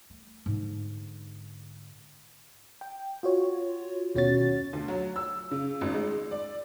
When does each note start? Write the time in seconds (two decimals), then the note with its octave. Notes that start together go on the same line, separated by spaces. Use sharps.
0.10 A3
0.46 G#2 D3
2.81 G5
3.23 F4 F#4 C#5
4.15 D#2 B2 C#4 F#4 C#5 A6
4.73 D2
4.88 F#3
5.16 E6
5.51 C#3
5.81 G#1
5.94 G#3
6.31 D5